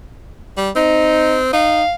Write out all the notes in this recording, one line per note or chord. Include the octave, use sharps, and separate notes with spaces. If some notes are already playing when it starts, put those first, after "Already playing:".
G3
C4 D#4
D#4 F5